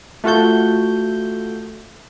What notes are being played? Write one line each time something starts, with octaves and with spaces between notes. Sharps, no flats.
A3 F4 F#4 A4 G6